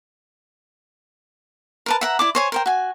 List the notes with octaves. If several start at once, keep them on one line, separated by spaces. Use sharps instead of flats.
A#4 B4 A5
E5 F#5 A#5
E4 D5 D6
C5 C#5 G#5
A#4 C5 G5
F#4 G#5